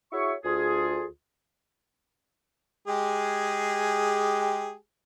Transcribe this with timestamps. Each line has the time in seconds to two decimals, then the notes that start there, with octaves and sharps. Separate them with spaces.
0.13 E4 F#4 G#4 C#5 E5 C#6
0.45 D2 F4 G#4
2.87 G#3 G4 G#4